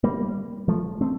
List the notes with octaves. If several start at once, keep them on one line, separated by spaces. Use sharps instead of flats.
G3 A#3
F3 A3
A3 C4